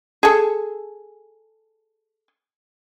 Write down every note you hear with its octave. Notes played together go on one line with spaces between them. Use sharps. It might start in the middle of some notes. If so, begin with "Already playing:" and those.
G#4 A4